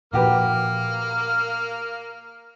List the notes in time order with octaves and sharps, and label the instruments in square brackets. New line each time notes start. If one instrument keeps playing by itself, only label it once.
[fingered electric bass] A#2 F3 [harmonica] A#3 F6 [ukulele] F#4 G4 B4